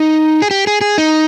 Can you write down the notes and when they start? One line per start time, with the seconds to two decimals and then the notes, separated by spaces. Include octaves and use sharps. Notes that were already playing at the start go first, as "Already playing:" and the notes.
Already playing: D#4
0.42 G#4
0.51 G4
0.67 G#4
0.81 G#4
0.98 D#4